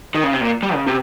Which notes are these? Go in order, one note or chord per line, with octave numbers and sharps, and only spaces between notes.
D#3
C#3
C3
A#2
G3
C#3
C3